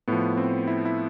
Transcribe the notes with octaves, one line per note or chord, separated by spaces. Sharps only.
A2 F3 B3
C4
E4
E4